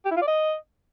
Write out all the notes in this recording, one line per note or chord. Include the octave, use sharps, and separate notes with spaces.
G4
E4
F4
D5
D#5